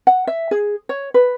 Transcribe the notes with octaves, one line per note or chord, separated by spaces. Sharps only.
F#5
E5
G#4
C#5
B4